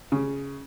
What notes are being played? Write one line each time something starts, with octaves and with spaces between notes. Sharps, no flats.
C#3